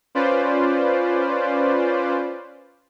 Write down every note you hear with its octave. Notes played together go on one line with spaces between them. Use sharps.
C#4 F4 B4 C5 D5